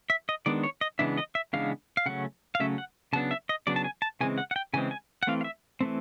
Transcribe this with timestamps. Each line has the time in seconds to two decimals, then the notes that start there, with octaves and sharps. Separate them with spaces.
0.10 E5
0.29 D#5
0.46 D#3 G#3 B3 D4 D5
0.63 C#5
0.81 D#5
0.99 C#3 E3 G#3 B3 D4 E5
1.17 D#5
1.35 E5
1.53 C#3 E3 G#3 B3 D4 F5
1.97 F5
2.06 C#3 F#3 A3 C#4 F#5
2.55 F5
2.60 C#3 F#3 A3 C#4 E5
2.78 F#5
3.13 C#3 F#3 B3 D4 A5
3.31 E5
3.49 D#5
3.67 C#3 F#3 B3 D4 D5
3.76 A5
3.84 G#5
4.02 A5
4.21 C#3 E3 G#3 C4 G#5
4.38 F#5
4.51 F#5
4.56 G5
4.74 C#3 E3 G#3 C4 G#5
4.91 G#5
5.23 F#5
5.27 E3 A3 C4 F5
5.41 F5
5.44 E5
5.81 E3 A3 C4